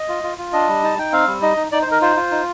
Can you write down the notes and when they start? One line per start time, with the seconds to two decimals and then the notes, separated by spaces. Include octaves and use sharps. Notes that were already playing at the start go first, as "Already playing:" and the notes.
Already playing: D#5
0.09 F4
0.23 F4
0.38 F4
0.53 D4 D#5
0.68 G3
0.83 D#4 A5
0.98 D#4 G5
1.12 C4 F5
1.27 G3
1.42 D#4 D#5
1.57 D#4
1.72 D#4 D5
1.82 C5
1.87 D#4 A#4
2.02 F4 C5
2.16 F4
2.31 D#4